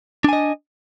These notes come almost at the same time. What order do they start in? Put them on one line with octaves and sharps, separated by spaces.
D4 G#5 D#5